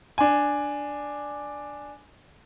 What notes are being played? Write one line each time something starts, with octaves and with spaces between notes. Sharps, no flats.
D4 G#5